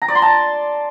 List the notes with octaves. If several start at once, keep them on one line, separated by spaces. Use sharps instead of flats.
A#5
D5
C6
A5